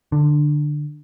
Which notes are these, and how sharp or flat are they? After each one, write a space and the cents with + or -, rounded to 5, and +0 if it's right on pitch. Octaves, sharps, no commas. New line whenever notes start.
D3 +15